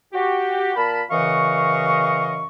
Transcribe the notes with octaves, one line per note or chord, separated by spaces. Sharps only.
F#4 G4
A#2 A#4 A5 B5
F#2 C#3 E3 D#5 F5 C#6